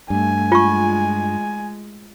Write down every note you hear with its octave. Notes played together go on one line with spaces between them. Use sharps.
G2 A3 G#5
G#3 F4 C#6